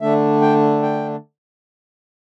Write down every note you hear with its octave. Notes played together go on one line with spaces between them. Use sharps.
D3 A3 D4 E5
G5
G5